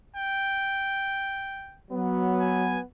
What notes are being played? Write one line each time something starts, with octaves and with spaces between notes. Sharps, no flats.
G5
F#3 B3
G#5